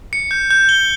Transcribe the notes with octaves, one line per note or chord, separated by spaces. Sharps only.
C#7
G6
G6
G7